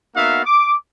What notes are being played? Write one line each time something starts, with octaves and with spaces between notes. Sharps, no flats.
A#3 B3 D#4 F#4 E5 F5
D6